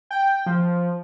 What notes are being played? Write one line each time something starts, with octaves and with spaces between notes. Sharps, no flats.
G5
F3